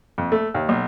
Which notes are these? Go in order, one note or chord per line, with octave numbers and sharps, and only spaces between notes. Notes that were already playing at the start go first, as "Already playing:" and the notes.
F2
A3
D#2
B1